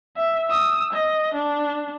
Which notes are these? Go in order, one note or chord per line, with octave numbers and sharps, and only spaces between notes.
E5
D#6 E6
D#5
D4